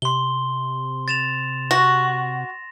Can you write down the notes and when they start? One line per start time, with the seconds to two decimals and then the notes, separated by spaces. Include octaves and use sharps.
0.02 C3 C6 G7
1.08 A6 E7 F7
1.71 F#4 A#6